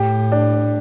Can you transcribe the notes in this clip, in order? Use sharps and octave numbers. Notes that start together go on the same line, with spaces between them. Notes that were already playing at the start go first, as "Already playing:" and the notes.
Already playing: A2 G4
D4